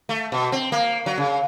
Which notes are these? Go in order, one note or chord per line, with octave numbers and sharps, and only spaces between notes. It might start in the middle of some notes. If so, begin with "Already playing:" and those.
A3
B2
C4
A#3
F#3
C#3